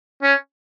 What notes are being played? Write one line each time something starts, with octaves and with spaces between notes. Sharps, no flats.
C#4